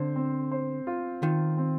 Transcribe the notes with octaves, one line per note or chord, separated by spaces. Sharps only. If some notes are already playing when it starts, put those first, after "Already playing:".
Already playing: D3 C4 C5
C4
C5
F4
D#3 F4
C4